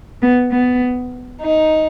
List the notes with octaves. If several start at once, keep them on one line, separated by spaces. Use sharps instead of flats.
B3
B3
D#4